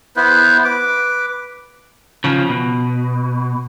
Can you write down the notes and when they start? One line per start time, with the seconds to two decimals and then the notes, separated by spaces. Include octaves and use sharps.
0.16 B3 E4 B4 C5
0.65 B4 D6
2.24 C#3 F3
2.49 B2